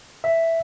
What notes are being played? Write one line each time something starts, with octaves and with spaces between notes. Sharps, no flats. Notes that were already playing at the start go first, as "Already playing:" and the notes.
E5